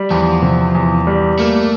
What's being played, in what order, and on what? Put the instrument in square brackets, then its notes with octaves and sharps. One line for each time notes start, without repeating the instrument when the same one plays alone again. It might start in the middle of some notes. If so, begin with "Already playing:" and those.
Already playing: [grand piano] G3
[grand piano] E2 [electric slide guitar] F3
[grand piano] C3
E2
G3
[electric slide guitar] A3 [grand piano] A#3